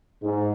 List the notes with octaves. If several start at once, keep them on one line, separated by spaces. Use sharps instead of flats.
G#2